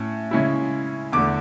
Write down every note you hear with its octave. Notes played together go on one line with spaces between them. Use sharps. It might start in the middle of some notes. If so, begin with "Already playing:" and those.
Already playing: A2 C#4
C#3 G#3 C#4 E4
E2 D3 A3 D6